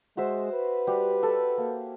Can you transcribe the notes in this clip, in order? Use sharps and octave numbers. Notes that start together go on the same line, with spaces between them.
G#3 F#4 C5 E5
B4
G3 F#4 G4
A4
A#3